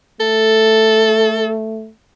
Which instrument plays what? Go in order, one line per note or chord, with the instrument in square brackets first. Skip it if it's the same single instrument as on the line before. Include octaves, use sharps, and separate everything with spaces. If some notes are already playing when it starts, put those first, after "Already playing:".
[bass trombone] A3 [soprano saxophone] A4